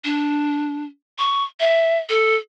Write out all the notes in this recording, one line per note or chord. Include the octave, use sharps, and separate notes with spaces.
D4
C#6
E5
A4